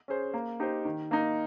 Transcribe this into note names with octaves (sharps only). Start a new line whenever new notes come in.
C#4 G#4 C5
A#3
D#4 G4 C5
D#3
A#3 D#4